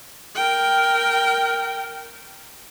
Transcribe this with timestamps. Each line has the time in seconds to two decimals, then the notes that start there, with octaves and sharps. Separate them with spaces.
0.35 A#4 G5